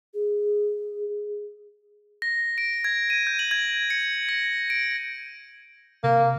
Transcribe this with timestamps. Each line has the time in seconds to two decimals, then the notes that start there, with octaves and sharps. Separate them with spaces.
0.14 G#4
2.22 A#6
2.58 D7
2.84 G#6
3.10 D#7
3.27 G6
3.39 F#7
3.51 G#6
3.90 C#7
4.29 A#6
4.70 D7
6.04 C3 A#3